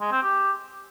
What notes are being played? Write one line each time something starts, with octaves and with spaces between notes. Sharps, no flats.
G#3
C4
G4